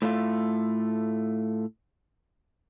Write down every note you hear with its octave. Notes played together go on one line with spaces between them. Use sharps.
A2 A3 F4